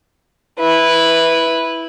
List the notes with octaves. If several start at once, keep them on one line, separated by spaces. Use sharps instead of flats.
E4 B4